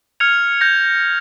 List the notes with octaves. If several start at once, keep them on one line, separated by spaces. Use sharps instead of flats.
F6 G#6 C#7 F7
G6 A#6